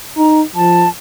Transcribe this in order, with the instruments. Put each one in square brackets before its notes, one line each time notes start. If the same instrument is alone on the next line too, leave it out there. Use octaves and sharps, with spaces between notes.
[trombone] D#4 [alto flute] A#5
[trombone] F3 [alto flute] A5